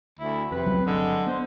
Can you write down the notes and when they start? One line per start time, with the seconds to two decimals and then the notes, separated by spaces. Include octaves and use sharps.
0.19 D2 E4
0.52 F2 C3 B4
0.66 C#2 F#3 C4
0.86 G1 D3 G#3
1.27 B3 D4 C5